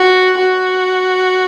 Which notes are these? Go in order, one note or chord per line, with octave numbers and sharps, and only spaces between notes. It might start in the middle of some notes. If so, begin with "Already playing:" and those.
Already playing: F#4
F#4